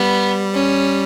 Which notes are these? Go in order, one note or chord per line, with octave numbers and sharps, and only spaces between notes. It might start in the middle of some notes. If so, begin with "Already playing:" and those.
Already playing: G3 B3
C#4